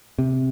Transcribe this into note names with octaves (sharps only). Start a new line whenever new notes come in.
C3